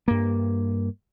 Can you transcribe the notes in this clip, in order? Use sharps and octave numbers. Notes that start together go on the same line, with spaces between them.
G2 A#3